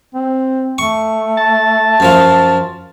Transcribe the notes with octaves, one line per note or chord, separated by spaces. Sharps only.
C4
A3 C#6
A5
F#2 F3 F4